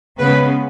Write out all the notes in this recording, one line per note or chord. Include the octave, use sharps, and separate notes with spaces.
C#3 G#3 B3 B4